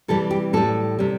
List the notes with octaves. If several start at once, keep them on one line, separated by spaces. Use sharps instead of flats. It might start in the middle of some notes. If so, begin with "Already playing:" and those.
C3 E3 G3 A4
G4
A2 G3 A4
C3 G3